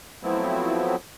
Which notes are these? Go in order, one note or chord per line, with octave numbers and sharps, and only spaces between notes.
F3 F#3 A3 B3 C4 E4